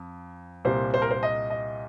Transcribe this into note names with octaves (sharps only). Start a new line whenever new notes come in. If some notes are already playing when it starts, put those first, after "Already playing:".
Already playing: F2
C2 A#2 G3 C5
C5
A#4
C5
D#5
D#5